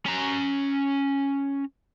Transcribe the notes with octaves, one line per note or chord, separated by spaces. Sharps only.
C#4 A#5